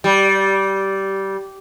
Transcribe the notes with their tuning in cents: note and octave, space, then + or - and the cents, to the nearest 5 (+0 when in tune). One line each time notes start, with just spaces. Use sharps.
G3 -15